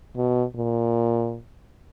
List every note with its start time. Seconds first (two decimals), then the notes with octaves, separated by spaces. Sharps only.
0.16 B2
0.56 A#2